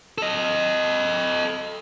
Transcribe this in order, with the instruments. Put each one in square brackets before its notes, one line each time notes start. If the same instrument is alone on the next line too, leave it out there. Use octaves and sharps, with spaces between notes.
[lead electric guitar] A4 D#5